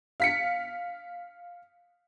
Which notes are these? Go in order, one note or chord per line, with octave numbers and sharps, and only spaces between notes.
F5 B6 C#7